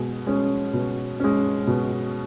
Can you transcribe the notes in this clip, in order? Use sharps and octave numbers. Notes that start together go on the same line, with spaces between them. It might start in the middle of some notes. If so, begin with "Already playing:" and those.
Already playing: B2 G#3
G#3 C#4
B2
G#3 C#4
B2